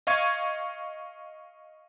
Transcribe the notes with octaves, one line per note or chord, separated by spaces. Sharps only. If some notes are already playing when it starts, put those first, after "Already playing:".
D#5 F5 C#6 G#6 D#7